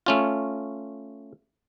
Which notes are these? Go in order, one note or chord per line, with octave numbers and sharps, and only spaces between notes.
A3 C#4 F4